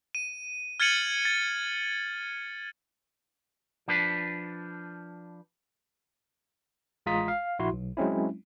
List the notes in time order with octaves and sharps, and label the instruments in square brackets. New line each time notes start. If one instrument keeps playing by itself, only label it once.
[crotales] D#7
F6 G#6 A6 C#7 D#7 F#7
A6
[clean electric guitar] F3 D4 B4
[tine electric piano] A1 G#3 F4 A#5 D#6 B6
F5
A#1 E4 F#4 C6
B1
F#3 G#3 C4 C#4 E4